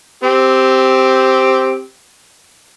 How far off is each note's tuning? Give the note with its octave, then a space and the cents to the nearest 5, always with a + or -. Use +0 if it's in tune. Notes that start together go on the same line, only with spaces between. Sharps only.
C4 +0 G4 +0 E6 -35